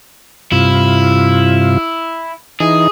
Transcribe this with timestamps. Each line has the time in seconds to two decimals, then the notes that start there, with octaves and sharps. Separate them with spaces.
0.52 G2 C3 E4 F4
2.60 E3 D#4 G#4